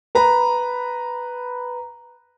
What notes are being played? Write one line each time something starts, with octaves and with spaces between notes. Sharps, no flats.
B4 A#5 B5